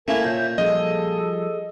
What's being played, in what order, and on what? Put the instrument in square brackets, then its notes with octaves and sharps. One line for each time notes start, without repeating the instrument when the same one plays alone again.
[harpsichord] A3 A#3 E4 [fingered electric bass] C#4 [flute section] A#4 G#5
[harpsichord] A#2 [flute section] C#5 E5 G6
[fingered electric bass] F3 G3 [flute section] G#4 A4 [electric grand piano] D#5